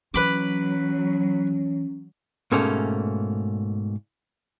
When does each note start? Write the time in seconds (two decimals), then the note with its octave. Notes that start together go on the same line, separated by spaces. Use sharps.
0.14 E3 F#3 C#4 B4 B5 D6
2.52 G#2 B2 A3 A#3 C#4